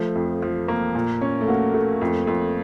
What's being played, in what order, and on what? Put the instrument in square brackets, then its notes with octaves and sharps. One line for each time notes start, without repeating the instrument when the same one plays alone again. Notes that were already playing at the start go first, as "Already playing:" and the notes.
Already playing: [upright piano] F3 [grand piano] A3
[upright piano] F2
F3
A#3
A#2
C#4
[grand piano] A3
[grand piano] A#3 [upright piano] F#4
[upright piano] A3
F2
F2